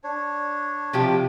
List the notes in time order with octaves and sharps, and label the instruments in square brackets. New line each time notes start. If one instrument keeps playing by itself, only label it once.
[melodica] D4 C#5
[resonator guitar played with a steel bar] C3 F3 G4